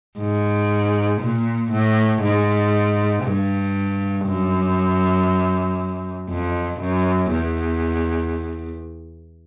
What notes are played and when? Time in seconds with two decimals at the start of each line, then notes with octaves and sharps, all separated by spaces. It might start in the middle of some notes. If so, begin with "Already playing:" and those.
0.19 G#2
1.21 A#2
1.71 A2
2.22 G#2
3.24 G2
4.26 F#2
6.29 F2
6.80 F#2
7.31 E2